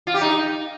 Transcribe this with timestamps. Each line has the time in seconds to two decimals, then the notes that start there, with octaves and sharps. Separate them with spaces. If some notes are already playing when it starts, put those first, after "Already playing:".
0.07 F4
0.14 G4
0.21 D#4